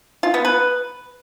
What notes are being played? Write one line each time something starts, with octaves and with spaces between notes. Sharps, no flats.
F4
B3
B4